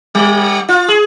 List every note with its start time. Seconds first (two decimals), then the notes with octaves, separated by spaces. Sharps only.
0.15 G3
0.69 F4
0.88 G#4